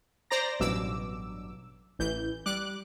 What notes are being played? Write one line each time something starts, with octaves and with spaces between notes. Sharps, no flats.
C5 D5 A#5 A#6
A1 G2 B2 F#3 D6 E6
A1 E3 G6
G3 D6 F#6